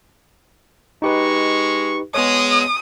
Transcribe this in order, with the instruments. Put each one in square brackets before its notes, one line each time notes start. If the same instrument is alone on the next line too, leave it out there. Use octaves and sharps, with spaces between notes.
[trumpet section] G#3 C#6 [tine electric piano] D#4 G4 B4
[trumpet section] G#3 [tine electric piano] B3 C#5 [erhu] D#6